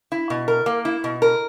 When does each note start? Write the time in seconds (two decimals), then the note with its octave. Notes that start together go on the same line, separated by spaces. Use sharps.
0.12 E4
0.30 B2
0.48 A#4
0.66 A#3
0.85 E4
1.04 B2
1.22 A#4